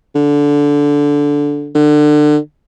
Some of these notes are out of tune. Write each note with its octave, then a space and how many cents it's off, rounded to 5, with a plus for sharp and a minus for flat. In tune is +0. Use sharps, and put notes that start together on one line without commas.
D3 -15
D3 +30